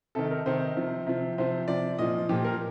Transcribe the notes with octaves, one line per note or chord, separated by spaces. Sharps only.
C3 D#3 A4
A#4
C3 D#3 C5
C3 F3
C3 F3
C3 F3 C5
C3 F3 D5
A#2 F3 D#5
A#2 F3 G4
A#4